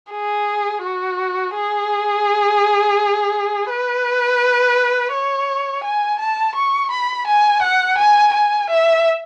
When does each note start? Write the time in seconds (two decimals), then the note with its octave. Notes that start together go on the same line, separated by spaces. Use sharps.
0.12 G#4
0.83 F#4
1.55 G#4
3.70 B4
5.12 C#5
5.84 G#5
6.19 A5
6.55 C#6
6.91 B5
7.27 G#5
7.62 F#5
7.98 G#5
8.34 G#5
8.70 E5